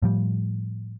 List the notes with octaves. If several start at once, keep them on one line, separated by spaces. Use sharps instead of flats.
A2 F3 G3